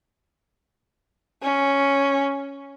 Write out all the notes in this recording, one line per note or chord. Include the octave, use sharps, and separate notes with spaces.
C#4